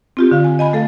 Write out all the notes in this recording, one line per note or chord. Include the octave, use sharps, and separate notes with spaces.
C4 F4 G4
D3 F5
G#5
D#5 G#5 B5
A3 A4 F5